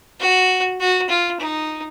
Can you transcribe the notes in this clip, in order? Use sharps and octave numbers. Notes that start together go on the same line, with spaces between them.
F#4
F#4
F4
D#4